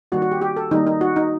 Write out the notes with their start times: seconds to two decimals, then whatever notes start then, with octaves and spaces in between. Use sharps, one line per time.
0.12 D#3 G3 A#3 F#4
0.22 F#4
0.32 G4
0.42 G4
0.57 A4
0.71 D#3 G3 A#3 D#4
0.87 D#4
1.01 F#4
1.16 D#4